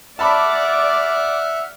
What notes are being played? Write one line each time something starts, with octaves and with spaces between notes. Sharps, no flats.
D5 E5 F#5 A5 B5 D6 F6